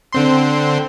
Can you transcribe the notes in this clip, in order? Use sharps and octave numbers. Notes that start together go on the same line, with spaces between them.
D3 C4 C6